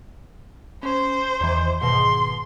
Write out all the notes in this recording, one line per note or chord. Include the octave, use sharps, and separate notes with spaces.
C#4 C5
E2 D#3 E3
G#2 B2 D#3 C6